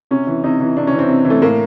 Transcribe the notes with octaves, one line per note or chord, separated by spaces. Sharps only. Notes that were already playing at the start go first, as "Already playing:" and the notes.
C3 C#4
E3
C3 D#4
E3
C3 D4
C#4
E3
C4
C3
E3
A3
A2 A#3